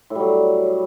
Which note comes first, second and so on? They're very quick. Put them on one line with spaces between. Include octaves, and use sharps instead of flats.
A2 G3 F#3